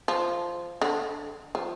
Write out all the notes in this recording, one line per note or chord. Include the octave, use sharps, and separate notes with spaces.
F3
D3
F3